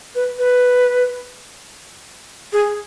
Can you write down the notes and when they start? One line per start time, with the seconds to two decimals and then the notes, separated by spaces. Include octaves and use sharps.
0.15 B4
0.39 B4
2.53 G#4